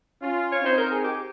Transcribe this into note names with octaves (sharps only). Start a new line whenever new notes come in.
C#4 F4
C#5
C4 D#4 C5
A#4
G#4
G4